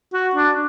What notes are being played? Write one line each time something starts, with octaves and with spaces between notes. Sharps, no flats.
F#4
D4